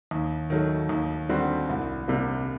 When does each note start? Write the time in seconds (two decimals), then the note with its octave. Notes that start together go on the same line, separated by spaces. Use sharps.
0.11 D#2
0.50 D#3 F#3 A3
0.89 D#2
1.29 D3 G3 C4 F#4
1.69 C2
2.08 C3 G3 A#3